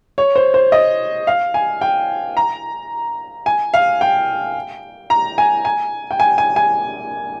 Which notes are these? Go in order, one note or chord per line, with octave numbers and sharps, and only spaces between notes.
C#5
C5
C5
D#5
F5
G#5
G5
A#5
G#5
F5
G5
A#5
G#5
G#5
G5
G#5
G#5
G#5